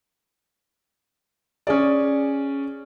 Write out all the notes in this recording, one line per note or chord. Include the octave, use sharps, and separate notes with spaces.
C#4 G#4 D5